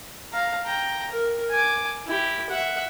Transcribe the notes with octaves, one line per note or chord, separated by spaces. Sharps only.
F5 A#5
G5 A#5
A#4
G#5 D6
E4 G4
E5 F#5